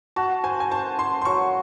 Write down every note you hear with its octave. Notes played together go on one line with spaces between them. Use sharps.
F#4 A5
C5 G#5
G#5
C5 A5
C5 C6
C6
F#3 C#6